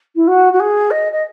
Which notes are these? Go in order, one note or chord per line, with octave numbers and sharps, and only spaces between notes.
E4
F#4
F#4
G#4
D#5
D#5